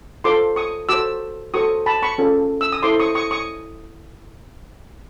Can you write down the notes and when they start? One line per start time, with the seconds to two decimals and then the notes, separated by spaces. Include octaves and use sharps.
0.24 F4 A4 C5 C6 D6
0.56 C#6 D#6
0.89 F#4 A4 C5 D6 E6
1.54 F#4 A4 C5 C#6 D#6
1.86 A5 B5
2.02 B5 C#6
2.18 C#4 F4 A4
2.61 E6
2.72 D#6
2.83 E4 A4 C5 C6 D6
3.00 C#6 D#6
3.15 C#6 D#6
3.31 C#6 D#6